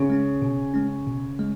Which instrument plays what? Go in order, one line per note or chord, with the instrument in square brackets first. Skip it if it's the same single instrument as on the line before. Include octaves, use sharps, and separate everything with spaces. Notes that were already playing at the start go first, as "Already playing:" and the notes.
Already playing: [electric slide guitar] C#3
[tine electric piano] G#3 C#4
B2
G#3 C#4
B2
G#3